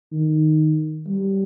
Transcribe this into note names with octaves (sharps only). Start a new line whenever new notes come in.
D#3
G3